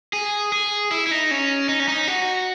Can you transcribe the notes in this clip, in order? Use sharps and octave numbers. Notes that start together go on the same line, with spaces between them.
G#4
G#4
E4
E4
D#4
C#4
D#4
C#4
D#4
F#4